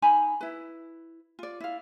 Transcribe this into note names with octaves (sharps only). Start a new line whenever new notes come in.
D#4 G#5 A#5 B5
E4 B4
F4 D5
E4 F5